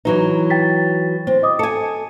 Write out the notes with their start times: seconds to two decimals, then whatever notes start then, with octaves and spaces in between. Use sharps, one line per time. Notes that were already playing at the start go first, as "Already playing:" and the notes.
0.05 E3 F#3 D#4 B4
0.50 G5 A6 B6
1.27 C4 C5
1.43 D#5 D6 D#6
1.59 A4 G#5 C#7